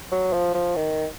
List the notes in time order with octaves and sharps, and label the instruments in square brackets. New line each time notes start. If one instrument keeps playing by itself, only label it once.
[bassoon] F#3
F3
F3
D#3